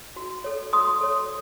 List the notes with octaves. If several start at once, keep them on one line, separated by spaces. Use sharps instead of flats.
F#4
A4 C#5
F#4 C6 D#6
A4 C#5